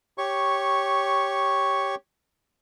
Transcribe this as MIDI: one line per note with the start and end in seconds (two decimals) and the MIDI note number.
0.18 1.95 67
0.18 1.95 73
0.18 1.95 85